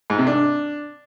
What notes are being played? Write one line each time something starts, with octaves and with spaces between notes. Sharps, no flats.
G#2
C3
D4